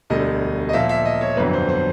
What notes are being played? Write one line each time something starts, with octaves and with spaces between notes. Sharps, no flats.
E1 D2 D3 G3 D#5
D#5
A#2 F3 A#3 E5
E5
D#5
C#5
G1 F2 D3 F#3 B4
C5
C5